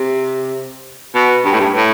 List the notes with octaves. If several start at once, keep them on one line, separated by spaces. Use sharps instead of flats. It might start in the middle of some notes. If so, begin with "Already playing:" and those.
Already playing: C3
B2
G2
A2
G2
A2